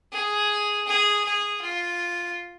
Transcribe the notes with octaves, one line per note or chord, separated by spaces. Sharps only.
G#4
G#4
G#4
F4